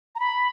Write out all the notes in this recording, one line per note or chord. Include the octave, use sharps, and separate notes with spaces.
A#5
B5